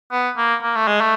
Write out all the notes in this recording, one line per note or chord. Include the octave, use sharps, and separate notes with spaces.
B3
A#3
A#3
A3
G#3
A3